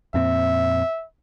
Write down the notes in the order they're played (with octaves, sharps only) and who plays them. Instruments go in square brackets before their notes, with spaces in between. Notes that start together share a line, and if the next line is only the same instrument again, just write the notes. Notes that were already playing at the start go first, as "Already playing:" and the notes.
[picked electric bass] F2 A#2 C4 [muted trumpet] E5